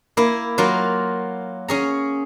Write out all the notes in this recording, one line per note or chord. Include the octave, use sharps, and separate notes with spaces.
A#3 E4
F#3 A#3 F4
C#4 G#4 A#5